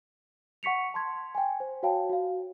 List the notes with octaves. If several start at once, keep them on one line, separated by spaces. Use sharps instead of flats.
F#5 C#6 B6 C#7 F7
A5 C6 G#6
G5 G#5
C5
F#4 C#5 F5 G5 A5
F#4 F5